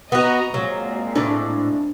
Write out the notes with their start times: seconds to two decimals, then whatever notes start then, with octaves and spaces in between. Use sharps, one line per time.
0.12 B3 F#4 D#5 A#5
0.54 A#2 F#3 G#3 C4
1.16 A2 D4 D5